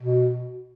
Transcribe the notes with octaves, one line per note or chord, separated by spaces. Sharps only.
B2